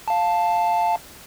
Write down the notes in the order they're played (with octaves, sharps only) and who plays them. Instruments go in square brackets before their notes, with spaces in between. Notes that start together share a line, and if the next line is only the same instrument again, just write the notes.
[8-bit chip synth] F5 A5